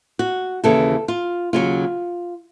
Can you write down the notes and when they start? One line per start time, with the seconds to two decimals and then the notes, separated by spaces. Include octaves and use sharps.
0.19 F#4
0.64 D#2 C#3 E3 A4
1.08 F4
1.53 D#2 C#3 F#3 F4